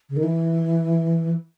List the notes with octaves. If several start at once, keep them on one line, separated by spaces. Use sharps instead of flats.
C#3
D#3
E3